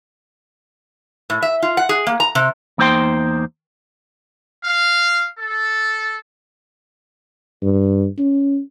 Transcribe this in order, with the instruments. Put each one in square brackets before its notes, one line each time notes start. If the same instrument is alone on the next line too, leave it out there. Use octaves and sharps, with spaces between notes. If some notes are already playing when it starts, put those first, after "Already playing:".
[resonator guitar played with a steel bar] A2
E5
F4
F#5
G#4
A#3
A#5
C3
[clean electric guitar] E2 A#3 D#4 C5 G5 C6
[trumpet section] F5
A4
[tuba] G2
C#4